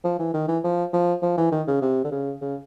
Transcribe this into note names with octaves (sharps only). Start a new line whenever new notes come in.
F3
E3
D#3
E3
F3
F3
F3
E3
D#3
C#3
C3
D3
C#3
C#3